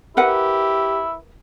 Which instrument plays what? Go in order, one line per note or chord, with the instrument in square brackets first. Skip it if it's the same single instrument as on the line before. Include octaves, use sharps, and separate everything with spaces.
[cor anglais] E4 [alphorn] G4 [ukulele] A#4 B4 F#5